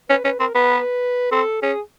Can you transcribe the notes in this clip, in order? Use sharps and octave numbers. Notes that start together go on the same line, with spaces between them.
C#4 B4
C#4 B4
C4 A#4
B3 B4
C4 A4
C#4 G#4